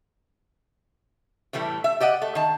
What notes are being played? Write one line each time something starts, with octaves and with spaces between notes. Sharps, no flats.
A2 E3 G3 A3
E5
G4 D5 D#5 F#5
A3
D#3 A5